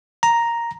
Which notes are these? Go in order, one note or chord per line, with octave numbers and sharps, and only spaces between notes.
A#5